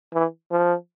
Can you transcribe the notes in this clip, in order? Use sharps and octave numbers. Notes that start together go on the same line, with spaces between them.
E3
F3